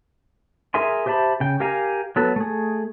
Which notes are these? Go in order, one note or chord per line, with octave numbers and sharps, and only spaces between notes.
G#4 A#4 E5 G#5 C6
G4 C5 E5 A5 B5
C#3 G5
G4 A#4 F5 G#5 A#5
F#3 B3 A4
A3 G#4